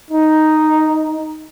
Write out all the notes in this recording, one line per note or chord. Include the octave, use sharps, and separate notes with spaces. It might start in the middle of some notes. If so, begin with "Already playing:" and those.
D#4